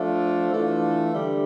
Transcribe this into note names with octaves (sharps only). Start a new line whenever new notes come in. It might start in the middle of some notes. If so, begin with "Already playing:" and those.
Already playing: F3 A3 D4 F4
E3 A3 D4 F4
D3 G3